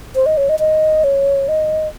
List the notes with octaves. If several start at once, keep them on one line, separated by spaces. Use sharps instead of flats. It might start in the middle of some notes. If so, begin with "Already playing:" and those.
C5
D#5
C#5
D#5
D#5
C#5
D#5